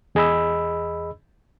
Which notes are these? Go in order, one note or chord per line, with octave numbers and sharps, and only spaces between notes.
E2 G#4 D#5 B5 E6